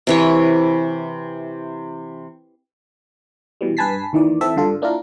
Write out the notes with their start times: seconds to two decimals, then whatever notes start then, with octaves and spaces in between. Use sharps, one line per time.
0.07 C3 E3 C#5
3.61 B2 E3 G3
3.77 G2 B4 G#5 A5 B6 C7
4.13 D#2 D#3 E3 D5
4.41 E3 C4 A4 E5
4.56 G2 D3 F4 A4
4.82 A#3 D4 E4 F4 A#4